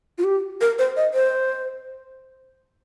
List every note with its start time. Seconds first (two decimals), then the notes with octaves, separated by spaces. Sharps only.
0.18 F4
0.24 G4
0.61 A#4
0.79 C5
0.97 D#5
1.14 C5